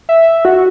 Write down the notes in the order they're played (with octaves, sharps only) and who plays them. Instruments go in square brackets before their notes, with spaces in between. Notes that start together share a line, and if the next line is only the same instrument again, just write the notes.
[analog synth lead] E5
F#4